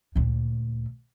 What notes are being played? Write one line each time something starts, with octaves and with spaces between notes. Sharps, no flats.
D2 A#2